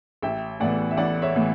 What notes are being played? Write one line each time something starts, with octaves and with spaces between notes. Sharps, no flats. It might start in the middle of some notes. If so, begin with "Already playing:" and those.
A1 E5 G5
A2 E3 B3 D5 F#5
E5
A1 D5 F#5
C#5 E5
A2 E3 B3